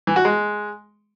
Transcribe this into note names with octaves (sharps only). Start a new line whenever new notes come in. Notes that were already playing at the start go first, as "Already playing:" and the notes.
E3
F#4
G#3